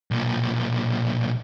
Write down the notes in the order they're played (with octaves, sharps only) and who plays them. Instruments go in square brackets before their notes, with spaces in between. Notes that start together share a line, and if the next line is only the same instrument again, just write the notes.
[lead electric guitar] B1 A#2